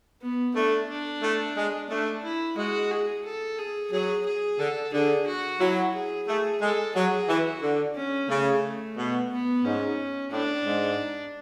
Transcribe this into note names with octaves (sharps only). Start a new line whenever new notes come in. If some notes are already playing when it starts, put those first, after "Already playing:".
B3
A3 D4
D4
A3
G#3
A3 D4
E4
G#3 F#4
G#4
A4
G#4
F#3 G#4
G#4
D3 A4
D3 G#4
F#4
F#3 E4
G#4
A3 G#4
G#3 A4
F#3 G#4
E3 F#4
D3
C#4
C#3 A3
B2
B3
G#2 C#4
A2 D4
G#2